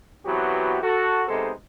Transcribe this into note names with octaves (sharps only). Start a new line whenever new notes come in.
E3 F#3 B3 C4 F#4 G4
F#4 A4
C3 G#3 B3 D#4 A4 C5